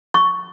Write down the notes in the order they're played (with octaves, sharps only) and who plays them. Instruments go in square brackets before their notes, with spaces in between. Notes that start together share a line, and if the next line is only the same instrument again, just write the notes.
[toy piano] C#6